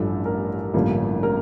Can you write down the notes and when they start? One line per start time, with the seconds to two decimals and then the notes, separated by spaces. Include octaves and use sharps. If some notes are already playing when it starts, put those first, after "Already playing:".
Already playing: A1 G2 F3 A4
0.25 A#4
0.74 A1 G2 D3 F3 A#3
1.23 A#4